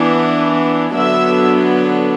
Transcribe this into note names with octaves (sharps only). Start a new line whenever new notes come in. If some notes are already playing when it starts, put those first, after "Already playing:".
Already playing: E3 B3 D4
D3 F#3 B3 D4 E5